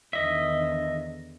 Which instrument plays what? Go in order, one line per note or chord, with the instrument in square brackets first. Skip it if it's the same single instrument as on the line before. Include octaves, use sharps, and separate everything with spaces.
[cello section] E2 D3 D#3 [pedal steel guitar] D#5 E5